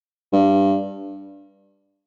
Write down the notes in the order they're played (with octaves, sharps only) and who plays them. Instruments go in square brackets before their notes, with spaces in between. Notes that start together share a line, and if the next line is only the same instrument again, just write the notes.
[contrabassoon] G2